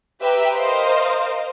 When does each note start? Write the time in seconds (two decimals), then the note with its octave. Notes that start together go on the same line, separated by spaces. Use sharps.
0.21 G4 B4 E5 G5 A#5
0.55 A#4 C5 D#5 F5